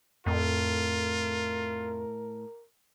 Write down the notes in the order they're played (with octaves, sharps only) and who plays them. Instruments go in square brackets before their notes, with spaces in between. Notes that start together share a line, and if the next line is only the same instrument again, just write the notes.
[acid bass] F2 [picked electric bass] A2 [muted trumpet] F4 [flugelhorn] A#4